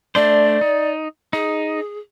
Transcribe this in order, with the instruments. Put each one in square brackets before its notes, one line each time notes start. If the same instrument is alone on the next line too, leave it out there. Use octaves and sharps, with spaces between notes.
[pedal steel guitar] A3 D4 C5 [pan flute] D5
[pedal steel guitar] D#4
[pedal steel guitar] D#4 [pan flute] G#4